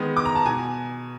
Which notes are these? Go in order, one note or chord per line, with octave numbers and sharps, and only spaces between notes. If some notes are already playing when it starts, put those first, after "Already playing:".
Already playing: D#3 G#3 B3
D6
A#5
A5
B2 G#5